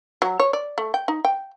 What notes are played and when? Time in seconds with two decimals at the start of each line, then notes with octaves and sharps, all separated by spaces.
0.22 F#3
0.40 C#5
0.53 D5
0.78 A3
0.94 G5
1.08 D#4
1.25 G5